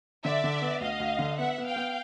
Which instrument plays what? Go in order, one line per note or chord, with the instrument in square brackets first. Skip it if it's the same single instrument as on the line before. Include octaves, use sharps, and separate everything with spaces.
[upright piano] D3 [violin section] D5 E5
[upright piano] D3
B3
[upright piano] D2 [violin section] D#5 F5
[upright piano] D2
D3
[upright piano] B3 [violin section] E5 F#5
[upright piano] B3
[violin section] F5 G5
[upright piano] B3